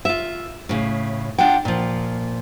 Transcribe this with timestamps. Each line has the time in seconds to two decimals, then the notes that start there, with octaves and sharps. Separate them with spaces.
0.05 F4 E5
0.69 A2 C#3
1.38 D4 F4 F#5 G5
1.65 A#2 F3